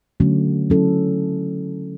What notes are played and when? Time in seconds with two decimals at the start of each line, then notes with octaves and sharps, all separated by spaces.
0.20 D3 F#3 A3 C#4 F#4
0.70 F#3 C#4 E4 A4